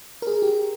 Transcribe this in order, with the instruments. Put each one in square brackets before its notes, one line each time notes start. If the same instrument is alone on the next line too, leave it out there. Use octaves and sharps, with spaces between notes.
[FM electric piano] A#4
G#4
G4